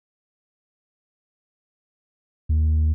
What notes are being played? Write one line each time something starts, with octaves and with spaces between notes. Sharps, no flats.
D#2